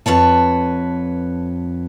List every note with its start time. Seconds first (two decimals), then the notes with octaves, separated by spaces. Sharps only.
0.06 F2 B4 C#5 A5